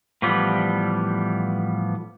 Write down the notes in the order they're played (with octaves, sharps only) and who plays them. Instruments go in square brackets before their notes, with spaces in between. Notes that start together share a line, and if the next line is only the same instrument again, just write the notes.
[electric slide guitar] A2 E3 F3 G3 B3